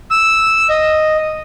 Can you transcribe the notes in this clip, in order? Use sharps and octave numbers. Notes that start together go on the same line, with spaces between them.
E6
D#5